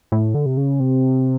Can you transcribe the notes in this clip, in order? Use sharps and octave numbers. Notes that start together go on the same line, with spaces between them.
A2
D3
C3
C#3
C3